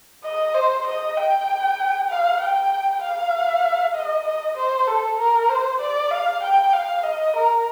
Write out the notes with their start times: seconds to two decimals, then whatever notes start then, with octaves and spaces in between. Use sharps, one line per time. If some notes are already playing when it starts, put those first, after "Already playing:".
0.24 D#5
0.54 C5
0.87 D#5
1.17 G5
2.10 F5
2.41 G5
3.02 F5
3.94 D#5
4.25 D#5
4.57 C5
4.87 A4
5.19 A#4
5.49 C5
5.81 D5
6.11 F5
6.43 G5
6.73 F5
7.03 D#5
7.35 A#4